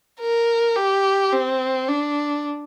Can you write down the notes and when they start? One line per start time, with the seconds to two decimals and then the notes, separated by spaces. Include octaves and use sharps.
0.20 A#4
0.76 G4
1.32 C4
1.88 D4